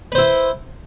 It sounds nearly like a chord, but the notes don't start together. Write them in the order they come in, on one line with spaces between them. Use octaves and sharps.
B4 C5 E4